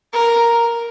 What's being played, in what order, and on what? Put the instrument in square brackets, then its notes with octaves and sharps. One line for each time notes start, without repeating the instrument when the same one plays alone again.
[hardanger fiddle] A#4